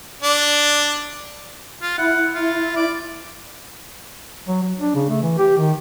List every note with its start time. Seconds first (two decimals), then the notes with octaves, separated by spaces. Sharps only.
0.22 D4
1.82 F4
1.98 E4 F#5
2.35 F4
2.76 D5
4.48 F#3
4.63 F#3
4.79 D4
4.95 C#3
5.09 A3
5.22 E3
5.38 G4
5.58 D#3